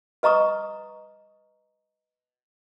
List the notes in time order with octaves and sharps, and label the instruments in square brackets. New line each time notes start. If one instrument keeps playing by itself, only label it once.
[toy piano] B4 D#5 A#5 C#6 D#6